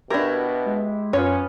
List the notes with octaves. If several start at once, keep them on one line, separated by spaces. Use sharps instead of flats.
B2 D4 E4 F#4 G4 A#4
G#3
F#2 B3 C#4 F4 C#5